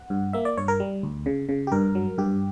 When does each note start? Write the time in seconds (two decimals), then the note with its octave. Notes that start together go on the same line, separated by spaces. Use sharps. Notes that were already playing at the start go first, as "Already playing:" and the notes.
Already playing: F#5
0.10 G2
0.33 A#3 E5
0.45 D5
0.57 G2 C#5
0.68 A#4
0.80 G3
1.03 D2
1.26 C#3
1.49 C#3
1.67 G4
1.72 G2 A#4
1.95 F#3
2.18 G2 G4